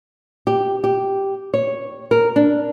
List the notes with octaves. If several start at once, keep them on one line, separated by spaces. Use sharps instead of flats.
G4
G4
C#5
A#4
D4